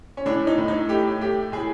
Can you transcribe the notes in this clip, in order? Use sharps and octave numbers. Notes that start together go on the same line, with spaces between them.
C#4
A2 D4
D#4
A2
D#4
A3 G4
A3 G4
A2 G#4